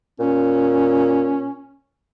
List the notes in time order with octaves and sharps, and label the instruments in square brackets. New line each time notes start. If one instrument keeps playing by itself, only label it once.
[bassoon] A#2 [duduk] C#4